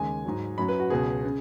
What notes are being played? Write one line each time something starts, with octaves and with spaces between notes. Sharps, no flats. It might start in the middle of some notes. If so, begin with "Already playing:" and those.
Already playing: D#2 C#3 G#3 G#5
G#2 F#3
F#2 F#3 B5
B4
F#4
C#2 B2 F#3 G#4
C#3